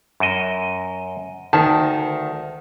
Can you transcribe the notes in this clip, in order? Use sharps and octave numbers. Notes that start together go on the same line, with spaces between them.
F#2 D#5
D2 D#3 A5